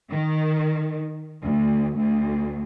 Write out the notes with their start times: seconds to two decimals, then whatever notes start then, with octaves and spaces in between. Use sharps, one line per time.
0.11 D#3
1.44 D2
1.98 D2